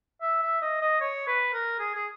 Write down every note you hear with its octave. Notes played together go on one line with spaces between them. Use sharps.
E5
E5
D#5
D#5
C#5
B4
A#4
G#4
G#4